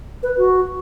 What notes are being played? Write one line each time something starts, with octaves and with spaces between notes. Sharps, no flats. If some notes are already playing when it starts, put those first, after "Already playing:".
B4
F#4